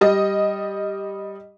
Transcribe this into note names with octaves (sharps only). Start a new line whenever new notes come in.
G3 D#5